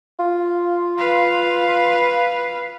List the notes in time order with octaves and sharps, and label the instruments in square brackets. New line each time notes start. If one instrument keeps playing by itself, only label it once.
[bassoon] F4
[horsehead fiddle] B4 F5